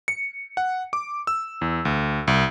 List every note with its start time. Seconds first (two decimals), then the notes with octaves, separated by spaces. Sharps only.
0.08 C#7
0.57 F#5
0.93 D6
1.27 E6
1.61 E2
1.85 D2
2.27 C2